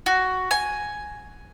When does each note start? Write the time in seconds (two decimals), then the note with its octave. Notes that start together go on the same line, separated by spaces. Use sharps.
0.06 F#4
0.51 G#5